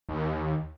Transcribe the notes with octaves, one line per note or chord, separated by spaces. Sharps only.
D#2